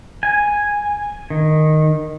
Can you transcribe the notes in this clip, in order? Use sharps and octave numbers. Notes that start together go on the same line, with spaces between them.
G#5
D#3